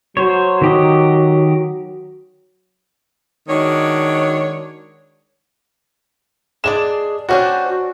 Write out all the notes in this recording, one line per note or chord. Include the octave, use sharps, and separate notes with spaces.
F#3 C5 C#5
D#3 G4 D#5
D#3 G#3 D4 F#4 C#5
G#3 D4 G#4 D5 E7
G3 C#4 D4 F#4 C5
F#4